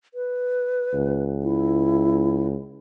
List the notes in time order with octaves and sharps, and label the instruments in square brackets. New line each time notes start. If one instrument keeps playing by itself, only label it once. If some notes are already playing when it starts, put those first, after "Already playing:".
[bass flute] B4
[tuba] C#2
[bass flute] E4